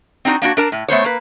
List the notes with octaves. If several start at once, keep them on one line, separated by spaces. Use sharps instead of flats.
C4 D4 D#4 F4 F#4
A#3 D4 D#4 F#4
D4 A#4 A5
A2
A3 B3 C5 C#5
A#3 B4